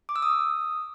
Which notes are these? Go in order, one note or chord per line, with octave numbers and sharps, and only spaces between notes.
D6
E6
D#6